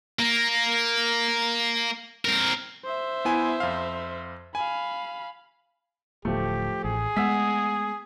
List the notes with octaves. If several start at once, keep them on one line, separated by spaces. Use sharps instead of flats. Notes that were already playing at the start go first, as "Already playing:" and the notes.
A#3
C4 A#4
C5 E5
B3 E4 G#5
F2 F5
F5 G#5 B5
D1 F3 A3 G4
A1 G#4
G#3 A3 B3 F#5 E6 B6